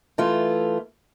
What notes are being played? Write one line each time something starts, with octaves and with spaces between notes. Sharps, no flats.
E3 A3 F4